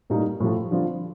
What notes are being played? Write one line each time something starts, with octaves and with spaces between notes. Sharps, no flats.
A2 G3 A#3 D#4
A2 F3 A3
D3 F3 C4 F4